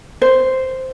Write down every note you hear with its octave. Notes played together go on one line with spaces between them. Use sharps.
C5